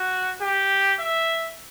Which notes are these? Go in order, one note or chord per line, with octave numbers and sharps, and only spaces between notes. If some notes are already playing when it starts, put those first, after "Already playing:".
Already playing: F#4
G4
E5